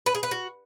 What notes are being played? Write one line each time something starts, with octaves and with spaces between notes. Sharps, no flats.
B4
G#4
B4
F#4